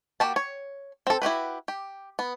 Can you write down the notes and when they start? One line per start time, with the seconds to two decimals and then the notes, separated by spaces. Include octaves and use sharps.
0.20 A#3 F#4 G4 A5
0.36 C#5
1.07 C4 A4
1.22 E4 F#4 G4 B4
1.68 G4
2.19 B3